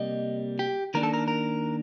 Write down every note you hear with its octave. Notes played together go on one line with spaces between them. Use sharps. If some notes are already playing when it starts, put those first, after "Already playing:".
Already playing: C3 G3 A#3 D#5
G4
D#3 A#3 D4 A#4
A4
A#4
A#4